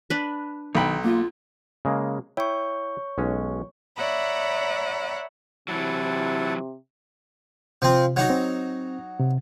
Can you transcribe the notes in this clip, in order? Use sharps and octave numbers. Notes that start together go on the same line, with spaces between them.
D4 B4
B1 D#3 G5 B5
A#3 F4
C#3 G#3 A#3
E4 C#5 G5 C#6
B1 G#3 C#4
C#5 D5 E5 F#5 A#5 B5
C3 E3 F#3 E4 F#5 A5
C3 F3 C4
F#3 D#4 F#4
C4
C3